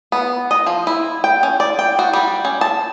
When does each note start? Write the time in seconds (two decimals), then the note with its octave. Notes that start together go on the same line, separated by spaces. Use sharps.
0.12 B3
0.51 D#5
0.66 F3
0.87 E4
1.24 G5
1.43 C#4
1.60 D5
1.79 G5
1.99 F#4
2.13 G3
2.45 C#4
2.61 A5